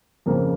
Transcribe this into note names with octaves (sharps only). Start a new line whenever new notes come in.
F2 C#3 F3 A#3